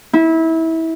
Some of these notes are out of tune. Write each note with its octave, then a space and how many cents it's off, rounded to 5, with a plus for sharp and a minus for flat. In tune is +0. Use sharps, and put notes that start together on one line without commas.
E4 -25